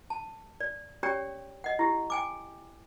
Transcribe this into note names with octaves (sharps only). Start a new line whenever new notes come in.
A5
D5
C#4 G4 C#5 D5 G5
D#5 F#5
E4 G4
G5 G#5 D6